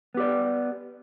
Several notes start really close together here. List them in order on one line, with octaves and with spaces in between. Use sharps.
B3 G4 D5